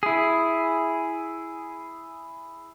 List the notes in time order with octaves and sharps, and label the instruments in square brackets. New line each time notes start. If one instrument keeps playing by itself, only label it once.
[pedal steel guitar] E4 G#4